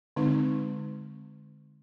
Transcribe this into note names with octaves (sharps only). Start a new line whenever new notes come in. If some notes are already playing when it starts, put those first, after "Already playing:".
D3 G#3 C4 D#4